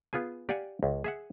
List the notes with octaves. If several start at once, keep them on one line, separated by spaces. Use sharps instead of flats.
B3 F4 G#4 G#5
G4 D5 F5 F#5 G#5
C#2
G#4 E5 F#5